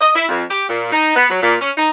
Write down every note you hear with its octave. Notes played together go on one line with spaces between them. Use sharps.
D#5
E4
F2
G4
A#2
D#4
B3
F#3
A#2
C#4
D#4